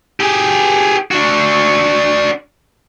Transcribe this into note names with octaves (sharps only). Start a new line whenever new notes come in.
G4 G#4
D4 F#4